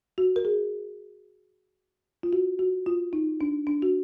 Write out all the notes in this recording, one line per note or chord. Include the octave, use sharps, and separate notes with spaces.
F#4
A#4
G#4
F4
F#4
F#4
F4
D#4
D4
D4
F#4